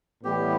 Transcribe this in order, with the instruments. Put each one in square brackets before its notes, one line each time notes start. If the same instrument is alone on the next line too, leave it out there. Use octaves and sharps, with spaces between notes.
[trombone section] A2 E3 G3 B3 E4 [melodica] G4